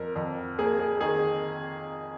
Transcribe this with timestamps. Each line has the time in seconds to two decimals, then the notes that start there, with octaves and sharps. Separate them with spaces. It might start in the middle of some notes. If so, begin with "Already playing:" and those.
Already playing: F2 A#4
0.16 F2
0.58 A#3 G#4
0.79 G#4
1.01 D#3 G#4